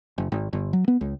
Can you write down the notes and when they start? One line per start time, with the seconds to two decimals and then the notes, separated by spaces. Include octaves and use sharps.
0.18 F#1
0.32 G#1
0.53 G1
0.73 F#3
0.88 B3
1.01 C#2